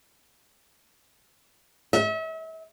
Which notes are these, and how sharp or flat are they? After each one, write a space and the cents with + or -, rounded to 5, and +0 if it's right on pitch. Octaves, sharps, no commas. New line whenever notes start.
E5 -40